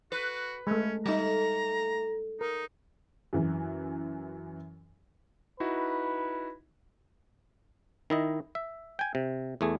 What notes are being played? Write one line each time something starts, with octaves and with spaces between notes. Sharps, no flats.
F#4 B4
G#3 A3 C#4
G3 A3 D#4 A#5
D#4 A#4
F#2 E3
D#4 E4 F#4 B4
D#3 E4 D#5
E5
G5 G#5
C3
E2 A3 G#4